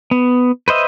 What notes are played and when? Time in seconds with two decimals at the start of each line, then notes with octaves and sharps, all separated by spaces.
0.11 B3
0.68 B4 C5 D#5 E5